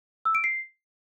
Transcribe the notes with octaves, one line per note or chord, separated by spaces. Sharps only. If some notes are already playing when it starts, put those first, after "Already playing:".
E6
D7
C7